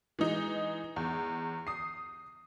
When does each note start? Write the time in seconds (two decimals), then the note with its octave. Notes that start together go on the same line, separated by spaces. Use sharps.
0.19 E3 G#3 D#4
0.96 E2
1.67 D#6 C7